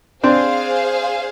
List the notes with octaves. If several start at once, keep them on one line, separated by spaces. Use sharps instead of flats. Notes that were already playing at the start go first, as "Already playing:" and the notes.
C4 D4 G#4 C5 F5